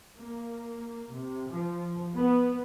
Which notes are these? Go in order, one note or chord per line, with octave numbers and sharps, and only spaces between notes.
A#3
C3
F3
B3